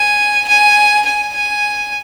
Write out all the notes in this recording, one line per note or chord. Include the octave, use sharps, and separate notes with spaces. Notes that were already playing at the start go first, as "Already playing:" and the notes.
Already playing: G#5
G#5
G#5
G#5